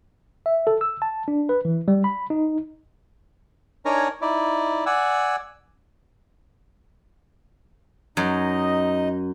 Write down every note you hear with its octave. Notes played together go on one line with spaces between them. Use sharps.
E5
A4
E6
A5
D4
B4
E3
G3
B5
D#4
D4 D#4 A#4 C#5 G#5 A#5
D#4 E4 D5
D5 F#5 G#5 E6
F#2 D#4 D#5